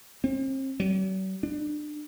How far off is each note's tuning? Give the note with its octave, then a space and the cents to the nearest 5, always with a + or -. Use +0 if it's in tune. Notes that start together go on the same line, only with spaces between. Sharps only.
C4 +40
F#3 +45
D4 +30